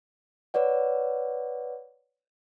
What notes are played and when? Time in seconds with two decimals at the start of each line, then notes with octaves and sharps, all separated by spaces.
0.54 B4 C#5 D5 F#5